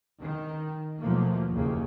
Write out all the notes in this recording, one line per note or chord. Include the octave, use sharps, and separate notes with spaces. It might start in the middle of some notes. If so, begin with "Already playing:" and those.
D#3
D#2 B2 F3 F#3 A3 A#3
F#1 D#2 C#3 A#3